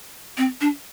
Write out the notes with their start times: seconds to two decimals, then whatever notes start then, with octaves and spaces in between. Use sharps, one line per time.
0.38 C4
0.61 D4